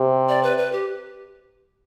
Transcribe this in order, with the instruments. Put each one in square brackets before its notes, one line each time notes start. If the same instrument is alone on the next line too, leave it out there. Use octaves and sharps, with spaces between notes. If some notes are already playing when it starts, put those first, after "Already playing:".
Already playing: [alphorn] C3
[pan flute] D5
B4
B4
G4